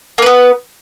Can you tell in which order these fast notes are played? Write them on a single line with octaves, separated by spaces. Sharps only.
A#3 B4 B3